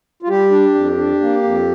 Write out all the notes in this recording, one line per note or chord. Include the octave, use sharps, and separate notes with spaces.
F4
G3 G4
D4
F2
D4
A#3
F2